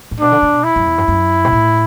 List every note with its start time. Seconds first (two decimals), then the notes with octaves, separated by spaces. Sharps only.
0.11 A2
0.20 B2 D4
0.32 D3
0.43 D3
0.53 B2
0.64 E4
0.76 F#2
0.86 E2
0.98 F#2
1.08 F#2
1.45 B2
1.52 A2